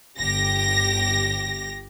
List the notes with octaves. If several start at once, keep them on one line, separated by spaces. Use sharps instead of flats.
G1 G4 A#6